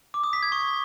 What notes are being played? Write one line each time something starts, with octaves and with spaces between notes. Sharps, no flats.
D6
D#6
B6
G#6
C#6